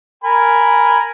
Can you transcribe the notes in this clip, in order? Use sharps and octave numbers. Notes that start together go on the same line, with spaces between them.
A#4 G#5 B5